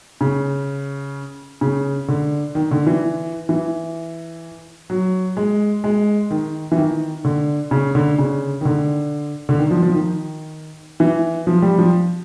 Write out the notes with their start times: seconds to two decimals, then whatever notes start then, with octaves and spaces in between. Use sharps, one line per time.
0.21 C#3
1.61 C#3
2.08 D3
2.55 D#3
2.71 D3
2.87 E3
3.49 E3
4.90 F#3
5.37 G#3
5.84 G#3
6.30 D#3
6.72 E3
6.77 D#3
7.25 D3
7.71 C#3
7.95 D3
8.19 C#3
8.61 D#3
8.65 D3
9.49 D3
9.58 D#3
9.71 F3
9.82 F3
9.94 D#3
11.00 E3
11.47 F3
11.62 G3
11.78 F3